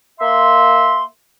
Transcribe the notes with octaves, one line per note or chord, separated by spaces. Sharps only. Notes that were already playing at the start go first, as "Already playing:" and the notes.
A#3 E5 C6